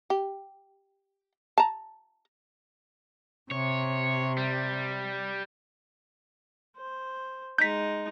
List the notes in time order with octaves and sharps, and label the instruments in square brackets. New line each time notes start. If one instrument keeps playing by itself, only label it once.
[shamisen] G4
A5 A#5
[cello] C3 [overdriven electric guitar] C#5
[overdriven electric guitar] G3
[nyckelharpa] C5
[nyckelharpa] G#3 D#4 [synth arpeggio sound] G6 B6